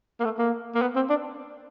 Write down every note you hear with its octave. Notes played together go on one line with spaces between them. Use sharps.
A#3
A3
A#3
A#3
B3
C4
D4